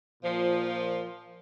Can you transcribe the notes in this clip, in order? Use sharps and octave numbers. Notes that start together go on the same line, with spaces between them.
A#2 F3